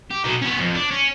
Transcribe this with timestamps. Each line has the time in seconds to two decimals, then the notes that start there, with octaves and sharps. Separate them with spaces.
0.11 G4
0.24 B2 D#4
0.42 B3 C#4
0.59 F2
0.75 D4
0.91 C#4